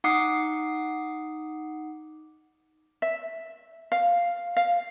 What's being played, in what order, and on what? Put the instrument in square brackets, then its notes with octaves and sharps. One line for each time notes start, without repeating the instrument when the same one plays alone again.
[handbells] D#4 F#5 D6 D#6 C7
[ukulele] E5
F5
F5